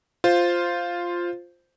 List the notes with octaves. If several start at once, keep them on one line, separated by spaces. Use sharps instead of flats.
F4 C5